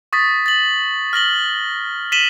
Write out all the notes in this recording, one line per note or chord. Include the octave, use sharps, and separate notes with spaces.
C#6 D#6 A6 B6
A6 F#7
F6 A#6 F#7 G7
B6 D#7 E7 F#7 G7